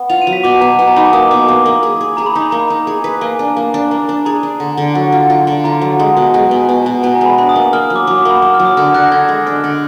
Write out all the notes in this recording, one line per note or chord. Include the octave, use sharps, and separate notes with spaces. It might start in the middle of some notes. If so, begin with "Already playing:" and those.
Already playing: B3
F4 F7
D#7
F#3
B6
B2 D6
B2 A#5
B2 G#5
A#5
D#4 B5
D6
A#3 D#6
B2 D6
A#3 D6
A#3
G#4
G#4
G#4 A#5
B5
D#4 A#5
B5
A#3 A#5
B5
D#4 A#5
G#4
B4
A#3 G#5
D4
A#3
D4
A#3 A#5
D4
G#4 A#5
D4
D3
D3
F#3
F4
F4
D3
F4 A#5
F#3
G#3
B2
G#3 G#5
B2
B2
B2
B2 G#5
A#5
G#3
B5
D4 B5
D#6
A#3
D#6
A#3 F6
D#6
F#3
D6
F#3 D6
D6
A#3
B5
A#3 D6
F6
F#3
D#6
D3 F6
D3 F#6
A#6
D3 G#6
G#3
D4 F6
D3